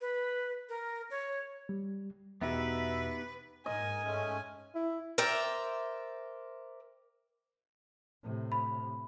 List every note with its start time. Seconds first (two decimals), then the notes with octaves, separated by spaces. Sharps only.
0.01 B4
0.69 A#4
1.11 C#5
1.69 G3
2.41 E2 B2 B3 D#4 G4 B4 E5
3.66 G#2 A#4 D#5 G#5
4.03 G#3 A3 C#4
4.75 E4
5.18 A#4 C5 D5 E5 G5
8.23 A2 C3
8.52 B5